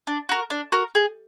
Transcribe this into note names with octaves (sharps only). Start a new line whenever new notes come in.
D4
F#4 A#4
D4
F#4 A#4
G#4